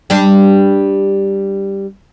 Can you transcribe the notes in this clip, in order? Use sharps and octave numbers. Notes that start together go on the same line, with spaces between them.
G3 D4 G4